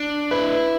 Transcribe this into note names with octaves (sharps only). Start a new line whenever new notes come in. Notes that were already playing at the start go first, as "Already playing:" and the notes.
Already playing: D4
E4 B4